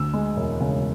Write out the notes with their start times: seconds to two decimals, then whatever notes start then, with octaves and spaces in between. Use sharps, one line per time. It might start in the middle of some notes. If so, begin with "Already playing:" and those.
Already playing: D2 E6
0.14 G#3
0.37 E1
0.61 C#3